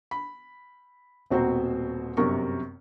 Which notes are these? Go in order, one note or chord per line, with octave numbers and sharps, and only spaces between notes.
B5
D#1 B2 C4 F#4 C5 A#5
G1 F#2 C3 A#4 C#6